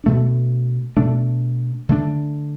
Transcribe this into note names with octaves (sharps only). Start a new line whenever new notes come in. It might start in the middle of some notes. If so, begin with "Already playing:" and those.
B2 A3 D4
B2 A3 D4
D3 A3 D4